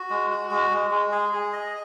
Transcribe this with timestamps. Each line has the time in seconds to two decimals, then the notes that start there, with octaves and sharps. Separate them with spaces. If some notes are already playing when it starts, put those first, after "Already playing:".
Already playing: F#4
0.10 G#3
0.31 F#4
0.51 G#3
0.71 G#3
0.91 G#3
1.12 G#4
1.33 G#4
1.53 D#5